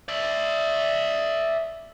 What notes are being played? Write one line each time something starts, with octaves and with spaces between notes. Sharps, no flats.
D5 E5